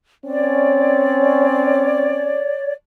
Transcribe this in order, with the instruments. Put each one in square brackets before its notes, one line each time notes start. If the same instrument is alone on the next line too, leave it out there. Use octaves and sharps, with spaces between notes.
[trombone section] C4 C#4 [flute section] C#5 D5